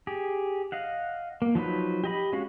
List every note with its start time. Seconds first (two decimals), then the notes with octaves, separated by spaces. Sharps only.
0.07 G4 G#4
0.72 D#5 F5 F#5
1.42 A#3
1.55 F3 F#3 D#4 B4
2.04 G4 D#5 B5
2.33 G#3 C#4 F#4 F5